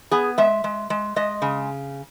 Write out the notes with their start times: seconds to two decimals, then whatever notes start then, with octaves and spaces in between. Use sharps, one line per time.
0.11 B3 G#4
0.38 G#3 E5
0.64 G#3
0.90 G#3
1.16 G#3 D#5
1.42 C#3